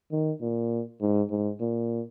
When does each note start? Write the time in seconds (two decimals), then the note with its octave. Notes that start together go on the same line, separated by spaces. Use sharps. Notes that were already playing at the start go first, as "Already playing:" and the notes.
0.12 D#3
0.41 A#2
1.01 G#2
1.30 G#2
1.60 A#2